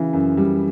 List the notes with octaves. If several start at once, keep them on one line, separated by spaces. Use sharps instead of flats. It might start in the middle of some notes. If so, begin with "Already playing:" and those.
Already playing: C#3 E3
F#2
G3